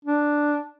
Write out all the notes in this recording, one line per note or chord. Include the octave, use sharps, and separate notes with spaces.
D4